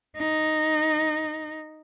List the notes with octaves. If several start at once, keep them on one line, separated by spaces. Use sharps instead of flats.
D#4